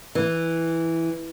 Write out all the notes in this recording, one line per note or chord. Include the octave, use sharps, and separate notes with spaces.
E3